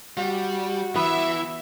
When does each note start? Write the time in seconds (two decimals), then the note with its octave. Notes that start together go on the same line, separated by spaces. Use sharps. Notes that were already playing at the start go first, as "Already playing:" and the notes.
0.17 G3 F#4
0.96 E3 B3 E5